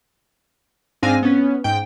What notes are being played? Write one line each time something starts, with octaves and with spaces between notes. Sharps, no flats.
G#2 C4 D4 F5 G#5 A#6
B3 C#4
G#2 G5